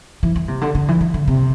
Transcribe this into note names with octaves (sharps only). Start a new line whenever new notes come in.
E3
E3
C3
D3
D3
E3
E3
D3
C3